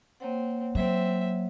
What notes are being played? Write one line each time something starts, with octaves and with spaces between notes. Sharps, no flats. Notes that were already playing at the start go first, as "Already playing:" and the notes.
A#3 C4 C#5 F#5
F#3 C4 E5